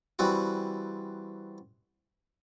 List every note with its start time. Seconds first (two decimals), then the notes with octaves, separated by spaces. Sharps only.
0.19 E3 G3 C4 F#4